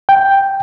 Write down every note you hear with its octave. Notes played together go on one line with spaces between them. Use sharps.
G5